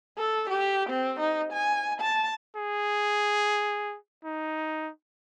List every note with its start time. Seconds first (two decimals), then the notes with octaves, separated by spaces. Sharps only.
0.18 A4
0.50 G4
0.90 C4
1.20 D#4
1.53 G#5
2.01 A5
2.56 G#4
4.24 D#4